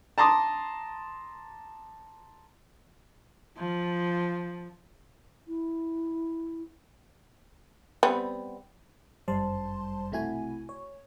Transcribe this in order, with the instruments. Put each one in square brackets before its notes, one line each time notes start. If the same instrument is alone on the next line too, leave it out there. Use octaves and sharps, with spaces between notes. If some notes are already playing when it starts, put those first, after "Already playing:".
[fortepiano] A5 A#5 C6 D6 D#6
[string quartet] F3
[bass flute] E4
[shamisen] G3 B3 C4
[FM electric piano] G1 F#2 G3 C5 A5 C6
B1 C3 A3 E4 F#4 G#5
C#5